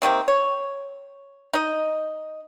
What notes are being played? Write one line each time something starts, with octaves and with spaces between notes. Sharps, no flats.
C3 D#3 A#3 C4
C#5
D#4 D#5